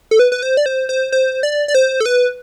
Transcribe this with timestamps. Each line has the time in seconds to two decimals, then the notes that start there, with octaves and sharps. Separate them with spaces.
0.11 A4
0.19 B4
0.32 B4
0.43 C5
0.57 D5
0.66 C5
0.89 C5
1.12 C5
1.43 D5
1.68 D5
1.75 C5
2.00 A4
2.06 B4